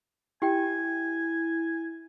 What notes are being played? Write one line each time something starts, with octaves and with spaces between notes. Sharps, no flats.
E4 G4 G5 G#5